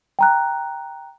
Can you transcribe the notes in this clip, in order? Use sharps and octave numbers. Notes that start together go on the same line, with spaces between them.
G5 A#5 F#6